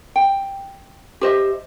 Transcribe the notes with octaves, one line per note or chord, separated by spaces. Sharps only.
G5
G4 C5 D#5 E5